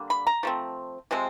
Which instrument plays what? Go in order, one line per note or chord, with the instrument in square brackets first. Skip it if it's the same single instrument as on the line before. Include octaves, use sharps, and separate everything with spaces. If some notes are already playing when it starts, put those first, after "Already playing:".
Already playing: [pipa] D3 G3 A#3
B5
A#5
F3 A3 C4
C3 F3 G#3 C4